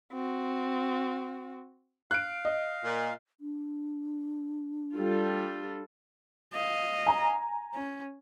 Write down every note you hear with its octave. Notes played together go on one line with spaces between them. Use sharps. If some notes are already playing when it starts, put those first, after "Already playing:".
C4 F#4
F5 F#6 D7
D#5
A#2
D4
G3 F4 A4
D#5 F5
G#5 A#5
C#4